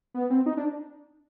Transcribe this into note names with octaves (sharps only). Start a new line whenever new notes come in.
B3
C4
D#4
D4